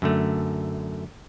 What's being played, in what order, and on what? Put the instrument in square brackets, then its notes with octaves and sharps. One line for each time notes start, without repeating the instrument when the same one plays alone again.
[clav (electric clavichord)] F#2 D3 A3